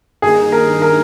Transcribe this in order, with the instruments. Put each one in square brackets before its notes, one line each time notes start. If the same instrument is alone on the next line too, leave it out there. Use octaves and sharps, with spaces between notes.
[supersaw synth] G2 D#3 A#3 D#4 [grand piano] G#4
[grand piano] A#4
A#4